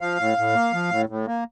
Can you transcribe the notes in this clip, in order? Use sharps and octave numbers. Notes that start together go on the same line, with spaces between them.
F3 F5
A2
A2
A#3
F3
A2
A2
A#3